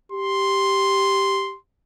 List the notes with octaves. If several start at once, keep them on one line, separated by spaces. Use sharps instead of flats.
G4 C6